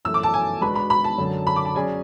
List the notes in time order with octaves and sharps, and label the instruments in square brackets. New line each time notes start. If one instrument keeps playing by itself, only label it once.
[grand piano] F#2 E3 A3 [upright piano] E6
[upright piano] D6
A5
G#5
[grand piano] G#3 D4 F#4 B4 D5 [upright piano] B5
[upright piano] B5
B5
A5
[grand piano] F#2 D3 F#3
[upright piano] B5
D6
A5
[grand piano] F#3 C#4 G#4 D5 [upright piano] G#5